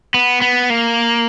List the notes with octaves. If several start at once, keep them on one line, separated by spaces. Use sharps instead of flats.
B3
B3
A#3